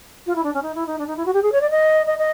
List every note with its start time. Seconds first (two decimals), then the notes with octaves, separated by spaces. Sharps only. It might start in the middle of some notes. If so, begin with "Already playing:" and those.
0.27 F4
0.36 E4
0.44 D4
0.54 C#4
0.63 D#4
0.75 E4
0.87 D#4
0.99 D4
1.07 D#4
1.17 E4
1.26 F#4
1.34 G4
1.43 G#4
1.52 C#5
1.61 D5
1.70 D#5
2.06 D#5
2.18 D#5